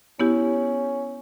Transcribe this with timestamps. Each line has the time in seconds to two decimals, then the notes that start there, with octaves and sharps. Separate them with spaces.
0.19 B3 C#4 E4 G4